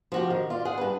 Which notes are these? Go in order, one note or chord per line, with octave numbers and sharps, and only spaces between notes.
F3 F#4 G4
D#3
F4 D5
G#4 F#5
G2 B4